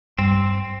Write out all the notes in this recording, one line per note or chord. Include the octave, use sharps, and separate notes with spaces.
G2 C4